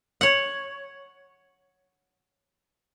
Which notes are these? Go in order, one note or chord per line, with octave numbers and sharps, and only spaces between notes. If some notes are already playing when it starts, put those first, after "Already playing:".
C#5 F#5